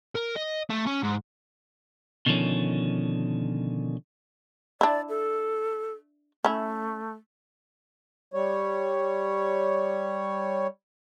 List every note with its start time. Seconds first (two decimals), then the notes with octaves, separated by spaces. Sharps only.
0.15 A#4
0.36 D#5
0.70 A3
0.86 C#4
1.03 G#2
2.26 B2 D3 D#3 F3 C#4
4.81 D4 E4 D5
5.09 A4
6.44 A3 C#4 E4
8.34 G3 C#5